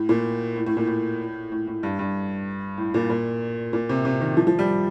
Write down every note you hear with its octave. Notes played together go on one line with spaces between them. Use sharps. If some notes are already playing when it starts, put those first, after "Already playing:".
Already playing: A2
A#2
A2
A2
A#2
A2
A2
A2
G2
G2
A2
A#2
A#2
A#2
C3
C3
D#3
F3
F3
G3